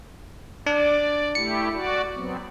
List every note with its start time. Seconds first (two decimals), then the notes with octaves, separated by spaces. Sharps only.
0.66 D4 D5
1.35 A3 E4 G4 C#7
1.72 F#4 D5
2.15 F#3 B3 C4